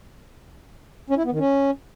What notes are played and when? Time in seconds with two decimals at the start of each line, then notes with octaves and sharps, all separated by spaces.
1.10 C#4
1.17 E4
1.25 B3
1.32 D#3
1.39 C#4